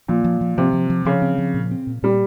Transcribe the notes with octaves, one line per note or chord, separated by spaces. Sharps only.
A#2 F3
F3
F3
C3 F3
F3
F3
C#3 F3
C4
F3
A#2
C4
A#2
A#2 G3